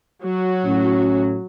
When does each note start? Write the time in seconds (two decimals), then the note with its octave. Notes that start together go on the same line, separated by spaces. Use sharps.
0.22 F#3 F#4
0.65 A2 C#4